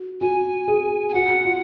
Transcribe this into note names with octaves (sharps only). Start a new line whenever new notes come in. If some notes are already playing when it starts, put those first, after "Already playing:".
Already playing: F#4
F#4 G#5
G#4
G#5
F#4 F#5
F4